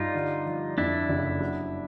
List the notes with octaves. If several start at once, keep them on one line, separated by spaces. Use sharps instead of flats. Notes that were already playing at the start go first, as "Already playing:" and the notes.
Already playing: G2 D#4 F4
D3
F3
F2 D4 E4
F#1
F#3